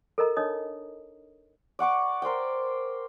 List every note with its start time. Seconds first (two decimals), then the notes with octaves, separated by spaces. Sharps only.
0.18 A4 A#4 D#5 A#5
0.37 D4 D#4 C#5 D#5 D#6
1.79 D5 F#5 C#6 D6
2.22 A#4 C5 D5 G5